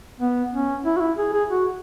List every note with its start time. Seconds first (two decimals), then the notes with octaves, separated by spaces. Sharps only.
0.20 B3
0.52 C#4
0.85 E4
0.96 F#4
1.00 E4
1.17 G#4
1.33 G#4
1.49 F#4